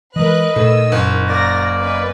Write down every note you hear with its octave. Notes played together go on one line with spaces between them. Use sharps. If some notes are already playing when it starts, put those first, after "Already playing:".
E3 G#3 A#4 B4 D#5 F#6
A#2 D#3 A3 E6
F#1
A#3 A#4 D5 A#6
C#4 B4 D#5